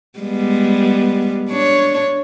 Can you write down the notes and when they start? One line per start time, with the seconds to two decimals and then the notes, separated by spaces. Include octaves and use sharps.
0.19 G3 G#3 B3
1.49 D4 C#5